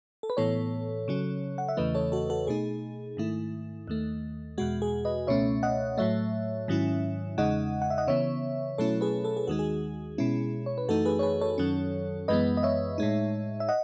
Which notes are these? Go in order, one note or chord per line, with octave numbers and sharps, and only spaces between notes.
A4
B4
A2 E3 B3 A4 C#5
C#3 F#3 C#4
F#5
E5
E2 C#3 E3 A3 B4 D#5
A4 C#5
F#4 A4
F#4 A4
B2 A3 D#4 G#4
G#2 D#3 A3 E4
D#2 D#3 A3
E2 B2 G#3 F#4
G#4
B4 D#5
C#2 B2 A3 C#4 C#5 E5
D#5 F#5
A2 F#3 A3 C#5 E5
G#2 D#3 F#3 C#4 E4
E2 C#3 G#3 D#4 D#5 F#5
F#5
E5
D#5 F#5
C#3 E3 B3 C#5 E5
B2 F#3 A3 C#4 E4 A4 C#5
G#4 B4
A4
G#4
D#2 D#3 G#3 D#4 F#4
G#4
B2 G#3 C#4 E4
C#5
B4
F#2 E3 A3 D#4 F#4 A4
G#4 B4
C#5
G#4 B4
A4 C#5
F#2 D#3 F#3 C#4
F#2 E3 G#3 B3 B4 D#5
D#5
C#5 E5
A2 G#3 D#4
E5
D#5 F#5